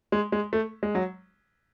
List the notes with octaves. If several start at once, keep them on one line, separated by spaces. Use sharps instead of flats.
G#3
G#3
A3
G#3
F#3